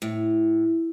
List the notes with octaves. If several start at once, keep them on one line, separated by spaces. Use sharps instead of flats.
A2